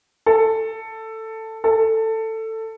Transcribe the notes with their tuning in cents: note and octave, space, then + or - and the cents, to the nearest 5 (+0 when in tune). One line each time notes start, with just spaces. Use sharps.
A4 +10
A4 +15